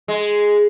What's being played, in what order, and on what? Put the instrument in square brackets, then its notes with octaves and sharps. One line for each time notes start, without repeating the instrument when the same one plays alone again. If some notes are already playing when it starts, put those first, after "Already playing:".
[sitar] G#3